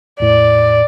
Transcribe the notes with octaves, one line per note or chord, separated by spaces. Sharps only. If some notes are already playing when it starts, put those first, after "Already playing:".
E2 A2 D5